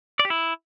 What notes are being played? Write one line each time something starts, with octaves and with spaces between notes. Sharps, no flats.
D5
G4
E4